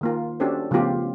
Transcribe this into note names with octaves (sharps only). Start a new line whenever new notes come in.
D#3 A#3 F4
C#4 D4 F#4 G4 A4 C5
C#3 F3 A3 B3 F4 G4